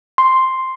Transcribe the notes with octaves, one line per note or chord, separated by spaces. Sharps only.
C6